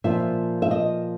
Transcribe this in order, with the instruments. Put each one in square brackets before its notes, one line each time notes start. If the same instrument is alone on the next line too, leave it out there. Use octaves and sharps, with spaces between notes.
[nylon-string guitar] A#2 F3 E5
E5
D#5